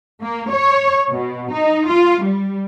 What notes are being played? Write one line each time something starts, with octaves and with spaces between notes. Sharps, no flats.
A#3
C#5
B2
D#4
F4
G3